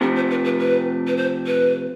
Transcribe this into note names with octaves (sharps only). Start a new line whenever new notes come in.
C3 F3 A3 C4 D4
C5
B4
B4
B4
B4
C5
B4